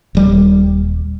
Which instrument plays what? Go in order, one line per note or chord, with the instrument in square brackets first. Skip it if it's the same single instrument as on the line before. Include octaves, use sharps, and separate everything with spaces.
[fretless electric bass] D#1 G3